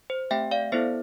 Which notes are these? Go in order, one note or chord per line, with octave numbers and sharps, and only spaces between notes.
C5
A3 C4 G4 E5 G5
D5 F5
B3 E4 A4 C5 E5